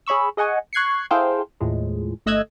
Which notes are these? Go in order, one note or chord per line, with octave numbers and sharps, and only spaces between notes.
G#4 C#5 B5 C#6 E6
G#4 D#5 F#5 G#5 C#6
C#6 F#6 G#6 C7 C#7
E4 G#4 A4 C5 F5 G5
D#2 A2 F3 G#3
G1 A3 D#5 E6 F#6 G#6